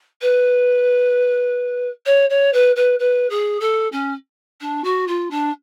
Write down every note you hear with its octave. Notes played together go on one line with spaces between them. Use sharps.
B4
C#5
C#5
B4
B4
B4
G#4
A4
C#4
D4
F#4
F4
D4